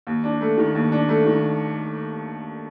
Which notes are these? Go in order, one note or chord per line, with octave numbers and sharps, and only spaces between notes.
D#2
D4
A3
D#3
D#2
D4
A3
D#3